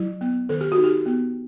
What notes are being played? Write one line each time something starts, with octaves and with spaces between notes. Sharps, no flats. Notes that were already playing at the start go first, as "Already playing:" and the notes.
Already playing: F#3 E4
B3
D#3 A4
G4
F#4
D#4
G4
B3